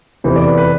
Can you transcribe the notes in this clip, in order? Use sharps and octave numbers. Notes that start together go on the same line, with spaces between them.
F1 E2 C3 E3 C5
D5
B4
B4